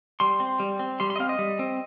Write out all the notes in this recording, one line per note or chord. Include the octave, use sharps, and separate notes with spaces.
G3 C6
C4
G3
C4
G3 C6
C6
D#5
C4 F5
D#5
G3
C4